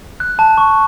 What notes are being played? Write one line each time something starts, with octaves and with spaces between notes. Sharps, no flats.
F#6
A5
C#6